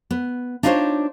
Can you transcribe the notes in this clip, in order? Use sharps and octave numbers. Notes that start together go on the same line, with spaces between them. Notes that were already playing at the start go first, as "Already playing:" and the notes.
B3
D4 D#4 F4 A#4 C5 C#5